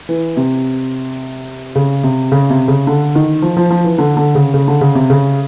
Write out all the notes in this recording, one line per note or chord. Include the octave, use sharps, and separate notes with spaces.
E3
C3
C#3
C3
C#3
C3
C#3
D3
D#3
F3
F3
F3
E3
D3
D3
C#3
C#3
D3
C#3
C3
C#3